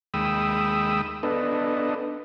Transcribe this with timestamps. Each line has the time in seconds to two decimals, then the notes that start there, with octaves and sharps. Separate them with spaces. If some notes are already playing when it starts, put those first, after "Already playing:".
0.14 D#2 G#3 G5 B5 D#6 E6
1.23 B3 D4 A4 B4 D#5